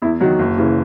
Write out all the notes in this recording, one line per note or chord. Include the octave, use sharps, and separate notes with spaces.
E2 E4
D#3 F#3 F#4
F#1
C#3 E3